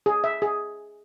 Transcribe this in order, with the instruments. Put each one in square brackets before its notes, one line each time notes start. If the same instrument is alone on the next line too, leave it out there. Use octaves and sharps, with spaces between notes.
[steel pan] G#4
E5
G#4